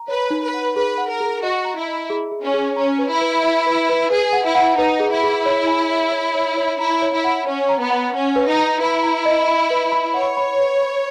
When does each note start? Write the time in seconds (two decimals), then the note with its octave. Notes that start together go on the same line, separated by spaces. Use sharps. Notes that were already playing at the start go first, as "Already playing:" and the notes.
Already playing: A#5
0.08 B4 C#5
0.30 D#4
0.42 B4
0.54 F#5
0.76 G#4 B4
0.98 F#5
1.09 A#4
1.20 G#4
1.43 F#4 D#5
1.65 A#5
1.76 E4
1.88 D#5
2.10 G#4
2.32 G#4
2.43 C#4
2.54 G#4
2.76 C#4 A#5
2.99 B4
3.10 E4
3.21 B4
3.43 E5
3.66 B4
3.89 B4
4.10 G#4 B4
4.33 F#5
4.44 E4
4.55 F#5
4.77 D#4 B4
5.00 G#4
5.11 E4
5.23 G#4
5.46 C#5
5.67 G#5
5.89 C#5
6.12 C#5
6.35 C#5
6.57 C#5
6.79 E4 A#5
7.02 C#5
7.13 E4
7.24 F#5
7.47 C#4 C#5
7.69 A#5
7.79 B3
7.90 F#5
8.14 C#4 F#5
8.36 B4
8.47 D#4
8.59 A#5
8.80 E4 B4
9.03 A#5
9.26 D#5
9.48 B5
9.70 B4
9.92 B5
10.14 C#5 F#5
10.37 B5
10.60 B4
10.82 B5